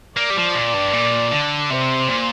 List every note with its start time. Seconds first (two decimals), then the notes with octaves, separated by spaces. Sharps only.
0.17 A#3 D5
0.30 G3
0.37 F3
0.55 A#2
0.74 G2
0.93 A#2
1.31 D3
1.70 C3 C5
2.08 A#2